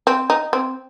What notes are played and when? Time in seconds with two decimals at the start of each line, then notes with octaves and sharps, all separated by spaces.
0.07 C4
0.30 D#4
0.53 C4